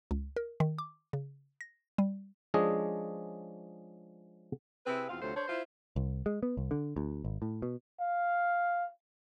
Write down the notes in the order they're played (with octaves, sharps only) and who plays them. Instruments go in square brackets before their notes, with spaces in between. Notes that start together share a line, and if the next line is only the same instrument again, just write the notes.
[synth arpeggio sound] C#2
A#4
D#3
D6
C#3
A#6
G3
[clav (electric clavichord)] F3 G#3 C#4 D4 G#4 D#5
[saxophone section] C3 C4 E4 G#4 B4
E2 B2 C4 F4 F5
D2 C3 F#3 A3 F4 C5
D4 A4 C5 C#5
E4 F4 C5
[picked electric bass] C2
G#3
B3
C2
D3
D2
G#1
A2
B2
[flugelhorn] F5